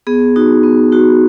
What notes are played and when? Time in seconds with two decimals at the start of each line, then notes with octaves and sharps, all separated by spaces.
0.07 B3 G#4
0.36 D#4 F#4
0.63 B3
0.92 D#4 F#4